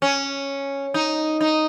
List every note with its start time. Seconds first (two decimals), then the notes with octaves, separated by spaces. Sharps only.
0.02 C#4
0.94 D#4
1.41 D#4